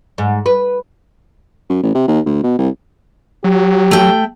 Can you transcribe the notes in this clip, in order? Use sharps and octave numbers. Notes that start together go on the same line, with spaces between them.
G#2
B4
F#2
A1
C3
D#2
D2
B2
C2
F#3 G4
A3 G5